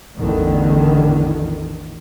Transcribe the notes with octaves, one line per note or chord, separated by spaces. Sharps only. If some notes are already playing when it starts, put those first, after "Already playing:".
A1 E2 D3 D#3